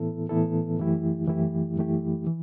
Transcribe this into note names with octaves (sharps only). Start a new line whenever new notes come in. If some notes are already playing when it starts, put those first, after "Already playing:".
Already playing: A2 E3 B3 E4 A4
A2 E3 B3 E4 A4
F#2 E3 A3 E4 G4
F#2 E3 A3 E4 G4
F#2 E3 A3 E4 G4
E3